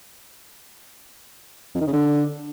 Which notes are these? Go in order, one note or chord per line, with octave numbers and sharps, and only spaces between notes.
F2
D#3
C#3
D3